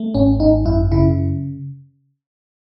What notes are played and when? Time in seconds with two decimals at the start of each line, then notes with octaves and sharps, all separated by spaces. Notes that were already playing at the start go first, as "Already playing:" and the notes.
Already playing: A3
0.14 G#1 C#4
0.40 G#1 D#4
0.65 F#2 E4
0.92 C#3 E4